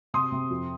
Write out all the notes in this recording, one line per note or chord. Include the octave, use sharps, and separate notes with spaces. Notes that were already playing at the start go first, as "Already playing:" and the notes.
C3 C6 D#6
C3
F2